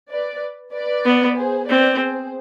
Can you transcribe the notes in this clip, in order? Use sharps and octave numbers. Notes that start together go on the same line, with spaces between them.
B4 D5
B4 D5
B3
G#4 C5
C4 B4 D5
G#4 C5